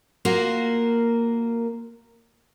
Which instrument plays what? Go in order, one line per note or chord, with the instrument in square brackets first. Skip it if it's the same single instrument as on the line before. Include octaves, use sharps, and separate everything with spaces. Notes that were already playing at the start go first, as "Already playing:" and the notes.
[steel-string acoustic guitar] A#3 F4 F#4 A#4